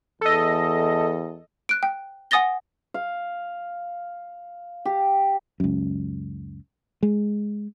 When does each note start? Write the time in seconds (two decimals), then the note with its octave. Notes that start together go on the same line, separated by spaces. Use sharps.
0.21 E2 A4 D#5
1.69 F#6 D7
1.83 G5
2.31 F#5 G#5 D#6 A6 A#6 G7
2.94 F5
4.85 G4
5.60 C#2 F#2
7.03 G#3